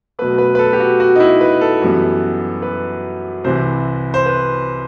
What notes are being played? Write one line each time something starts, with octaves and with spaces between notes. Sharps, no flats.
B2 F#3 A3 B4
B4
B4
A4
G4
F#4
F#4
D#4
E4
B4
A4
F#2 E3 G3 B3
B4
C2 C3 E3 C5
C5
B4